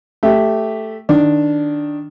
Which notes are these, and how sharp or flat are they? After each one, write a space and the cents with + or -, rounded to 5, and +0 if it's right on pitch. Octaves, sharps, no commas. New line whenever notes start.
A3 +0 G4 -5 E5 +0
D#3 +0 D4 +0